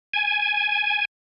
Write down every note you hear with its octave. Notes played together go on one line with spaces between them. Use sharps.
G#5